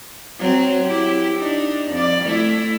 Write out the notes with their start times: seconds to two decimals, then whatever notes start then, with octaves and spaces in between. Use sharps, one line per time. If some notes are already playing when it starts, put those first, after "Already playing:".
0.39 F#3 C4
0.84 E4 G4
1.38 D4 D#4
1.91 F2 D5
2.25 A3 E4